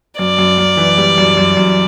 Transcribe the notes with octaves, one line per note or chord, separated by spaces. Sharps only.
F#2 D5
F#2
F#2
E3
G3
F#2
F#2
F#2